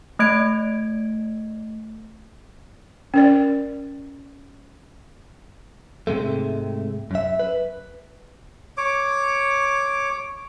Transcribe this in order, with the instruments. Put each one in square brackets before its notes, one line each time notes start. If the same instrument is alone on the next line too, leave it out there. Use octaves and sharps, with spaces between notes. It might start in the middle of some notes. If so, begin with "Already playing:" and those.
[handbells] A3 D#5 G#6 D7
[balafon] C#4 A#4 D5
[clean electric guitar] G#2 C3 G#3 A3
F#2 E5
B4
[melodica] C#5 D6